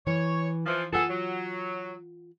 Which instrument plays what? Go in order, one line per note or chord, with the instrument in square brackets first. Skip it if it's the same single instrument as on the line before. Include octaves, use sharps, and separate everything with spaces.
[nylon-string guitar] E3 [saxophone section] C#5
[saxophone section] E3 F3
[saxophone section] B3 G#4 A4 [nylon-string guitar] F4 F#5
[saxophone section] F#3